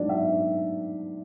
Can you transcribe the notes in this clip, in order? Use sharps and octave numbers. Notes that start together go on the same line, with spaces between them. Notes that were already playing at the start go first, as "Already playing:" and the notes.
Already playing: G#2 F#3 B3 D4 D5
E5